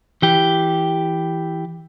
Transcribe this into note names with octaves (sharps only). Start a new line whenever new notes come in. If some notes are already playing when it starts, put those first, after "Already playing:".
E3 G4